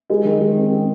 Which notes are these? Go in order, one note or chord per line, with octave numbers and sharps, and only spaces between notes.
G#3 D#5
D#3
G#3
C4
C4